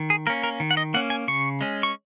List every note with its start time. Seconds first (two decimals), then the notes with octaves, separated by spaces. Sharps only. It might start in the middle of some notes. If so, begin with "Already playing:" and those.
Already playing: D#3
0.10 G#4
0.27 A#3 C#4 A#4
0.44 A#4
0.60 D#3
0.71 F#5
0.77 D#5
0.94 A#3 C#4 F#5
1.10 G#5
1.28 C#3 C#6
1.61 G#3 C#4
1.83 C#6